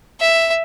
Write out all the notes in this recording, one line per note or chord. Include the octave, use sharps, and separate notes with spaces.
E5